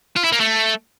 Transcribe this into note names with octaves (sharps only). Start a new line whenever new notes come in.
F4
E4
A#3
A3